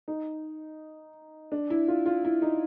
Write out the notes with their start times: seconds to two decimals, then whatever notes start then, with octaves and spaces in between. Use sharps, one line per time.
0.08 D#4
1.52 D4
1.70 E4
1.88 F4
2.06 F4
2.25 E4
2.42 D#4